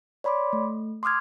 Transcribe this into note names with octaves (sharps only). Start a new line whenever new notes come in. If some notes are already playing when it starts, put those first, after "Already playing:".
C#5 D5 B5 C6 D6
A3
C6 D6 D#6 F6 G#6